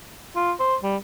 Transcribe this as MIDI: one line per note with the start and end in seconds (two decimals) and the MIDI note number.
0.36 0.52 65
0.60 0.76 72
0.83 0.96 55